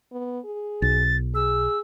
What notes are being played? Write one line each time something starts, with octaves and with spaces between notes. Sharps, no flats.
B3
G#4
B1 A6
G#4 E6